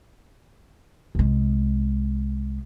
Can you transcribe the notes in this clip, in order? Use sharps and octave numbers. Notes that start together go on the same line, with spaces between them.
C2 G#3